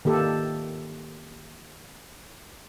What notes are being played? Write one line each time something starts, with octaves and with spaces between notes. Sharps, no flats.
D#3 A#3 G4 A4